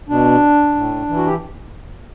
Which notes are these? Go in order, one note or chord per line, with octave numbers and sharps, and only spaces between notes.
B2 D4
A2
E3
F#4
G4